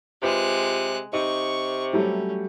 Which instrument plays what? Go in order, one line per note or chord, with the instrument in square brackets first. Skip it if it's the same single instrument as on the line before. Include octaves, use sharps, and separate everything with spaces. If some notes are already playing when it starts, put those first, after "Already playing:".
[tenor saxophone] C3 [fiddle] G#3 F#6 [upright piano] F4 B4
[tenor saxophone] C3 [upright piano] D#4 [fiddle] C#6
[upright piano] F#3 G3 A3 [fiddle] C#4